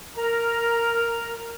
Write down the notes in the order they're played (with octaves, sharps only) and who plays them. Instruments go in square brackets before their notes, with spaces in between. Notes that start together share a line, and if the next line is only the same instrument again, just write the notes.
[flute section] A#4 A#5